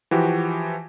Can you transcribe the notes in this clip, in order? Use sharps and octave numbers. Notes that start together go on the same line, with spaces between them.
E3 F3 F#4 G4